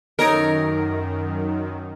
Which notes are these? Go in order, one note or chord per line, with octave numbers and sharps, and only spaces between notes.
F#2 D#3 D#4 A4 A#4 C#5